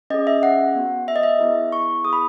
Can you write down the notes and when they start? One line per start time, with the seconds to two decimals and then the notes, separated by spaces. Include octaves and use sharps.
0.10 C#4 G#4 D#5
0.27 E5
0.43 F#5
0.75 B3 F#4
1.08 E5
1.16 D#5
1.23 E5
1.39 B3 E4 G#4
1.72 C#6
2.04 B3 E4 G#4 D#6
2.13 B5